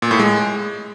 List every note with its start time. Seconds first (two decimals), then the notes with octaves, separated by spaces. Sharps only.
0.02 A#2
0.11 A2
0.19 G#3